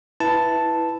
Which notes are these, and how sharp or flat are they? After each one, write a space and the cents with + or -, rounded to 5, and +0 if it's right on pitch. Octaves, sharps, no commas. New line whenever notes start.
E4 +0 B4 +0 A5 +0